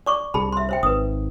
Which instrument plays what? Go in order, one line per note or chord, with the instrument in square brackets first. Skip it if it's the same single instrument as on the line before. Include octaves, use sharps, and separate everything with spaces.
[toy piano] D5 C#6 D6
[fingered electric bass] C2 [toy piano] G#4 A5 B5
[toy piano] E5 C6
C5 E5 G5
[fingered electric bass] G#1 [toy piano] B4 D#6